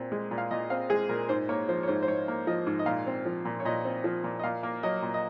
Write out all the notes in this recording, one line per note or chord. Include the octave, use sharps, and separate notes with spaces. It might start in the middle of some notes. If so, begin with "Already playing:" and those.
Already playing: A#2 C4
G#3
A#2
F5
A#2 D#5
C4 F5
G#3 G#4
A#2 A#4
G#2 C5
A#3 C#5
F3 C5
C#5
G#2 C5
C5
G#2 C#5
A#3
F3 D#5
G#2
D#5
A#2 F5
C4
F3
A#2
C#5
A#2 D#5
C4
F3
A#2
D#5
A#2 F5
A#3
F#3 D#5
A#2
D#5